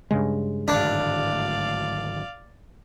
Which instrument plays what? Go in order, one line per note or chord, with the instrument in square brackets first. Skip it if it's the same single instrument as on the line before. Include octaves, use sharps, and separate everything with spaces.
[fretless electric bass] G2 C#3 G#3
[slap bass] D1 G#1 D2 [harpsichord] D4 [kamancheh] D5 F5